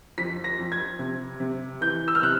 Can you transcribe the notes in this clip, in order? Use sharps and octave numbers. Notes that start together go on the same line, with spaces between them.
F2 B6
A#6
F2
G#6
C3
C3
E3 G6
E6
F6
C3 F#6